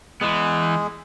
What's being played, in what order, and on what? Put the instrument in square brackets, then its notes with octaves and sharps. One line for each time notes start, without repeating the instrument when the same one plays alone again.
[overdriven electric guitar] E3 B3 [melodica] G#3 G#4